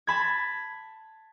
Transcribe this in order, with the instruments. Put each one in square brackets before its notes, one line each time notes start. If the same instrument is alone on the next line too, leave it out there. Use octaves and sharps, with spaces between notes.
[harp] A5 B5 G#6